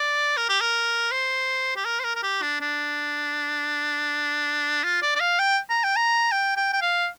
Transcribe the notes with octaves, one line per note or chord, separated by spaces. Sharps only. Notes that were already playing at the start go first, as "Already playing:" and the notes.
Already playing: D5
A#4
G4
A#4
C5
G4
A#4
C5
A#4
A#4
G4
D4
D4
F4
D5
D5
F5
G5
A#5
G5
A#5
G5
G5
G5
F5